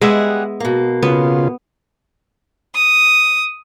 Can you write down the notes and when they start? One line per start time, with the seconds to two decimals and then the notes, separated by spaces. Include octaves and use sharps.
0.01 G3 G#3 B3 G#4 E5 F#5
0.60 B2 A#3
1.03 C#3 B3 F4
2.75 D#6